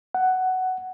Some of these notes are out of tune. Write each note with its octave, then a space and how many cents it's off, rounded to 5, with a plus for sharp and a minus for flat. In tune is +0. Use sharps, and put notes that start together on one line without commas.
F#5 +10